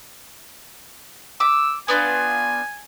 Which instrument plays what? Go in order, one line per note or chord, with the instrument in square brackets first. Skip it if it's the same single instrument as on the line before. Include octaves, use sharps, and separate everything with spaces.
[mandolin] D6 [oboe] E6
[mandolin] B3 D4 F4 [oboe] G#5